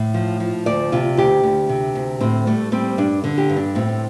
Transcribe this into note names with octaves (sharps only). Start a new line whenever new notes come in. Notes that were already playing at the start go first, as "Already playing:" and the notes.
Already playing: A2
F3
F3
D2 D5
C3 F4
D2 G4
D2
C3
D2
A2 C4
G3 A3
G3 C4
G2 D4
D3
G4
G2
D4
A2 C4